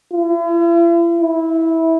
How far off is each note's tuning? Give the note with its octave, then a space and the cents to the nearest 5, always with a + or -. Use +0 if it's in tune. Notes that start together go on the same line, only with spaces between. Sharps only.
E4 +45
E4 -15